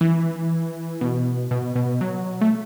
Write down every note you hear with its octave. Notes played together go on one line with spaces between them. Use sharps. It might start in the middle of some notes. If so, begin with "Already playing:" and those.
E3
B2
B2
B2
F#3
A3